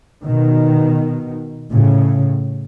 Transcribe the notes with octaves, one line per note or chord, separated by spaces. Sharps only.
B2 D#3
A2 C#3